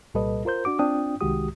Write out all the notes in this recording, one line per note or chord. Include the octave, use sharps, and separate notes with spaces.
C2 A#2 G3 A4 B4 D#5
F4 A#4 C5 G6
D4 F#4 D6
C4 D4 F4 G5 D#6
C2 D#3 G#3 F#4 G4 D#6